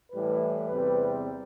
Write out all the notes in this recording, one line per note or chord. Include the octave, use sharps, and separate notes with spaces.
A2 E3 G3 B4
E2 C3 G3 C4